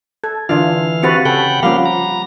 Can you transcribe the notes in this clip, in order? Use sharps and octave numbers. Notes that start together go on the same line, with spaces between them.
A4 G#6
D3 E3 D4 F4 F5
C4 F#4 G4 B4 A6 C#7
C#3 G#4 A4 F#5 G5 B5
F3 G3 A#3 C#4 F5 F#5 B5 D6
A#5